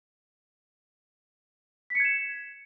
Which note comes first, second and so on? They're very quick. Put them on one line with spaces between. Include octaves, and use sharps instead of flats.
B6 C#7 G#6 E7